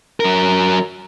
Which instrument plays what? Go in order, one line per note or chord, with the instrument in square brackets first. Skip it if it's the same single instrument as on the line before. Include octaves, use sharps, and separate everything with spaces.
[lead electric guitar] F#3 A#4